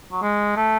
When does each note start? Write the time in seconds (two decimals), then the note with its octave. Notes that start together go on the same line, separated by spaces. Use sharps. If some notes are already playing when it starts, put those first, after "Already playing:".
0.12 F#3
0.22 G#3
0.56 A3